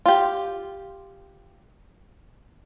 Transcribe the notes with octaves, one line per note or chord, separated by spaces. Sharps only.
F4 G4